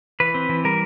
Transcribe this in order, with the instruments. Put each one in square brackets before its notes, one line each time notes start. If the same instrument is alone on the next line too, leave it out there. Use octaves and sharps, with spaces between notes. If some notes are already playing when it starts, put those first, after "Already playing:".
[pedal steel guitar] E3 B4
C4
E3
G3 A#4